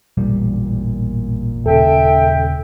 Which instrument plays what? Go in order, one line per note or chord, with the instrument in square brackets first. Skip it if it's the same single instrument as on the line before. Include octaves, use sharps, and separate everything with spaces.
[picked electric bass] E1 A1 G3 [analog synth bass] A#2
[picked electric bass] D#1 C#3 [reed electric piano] A4 [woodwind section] E5 G5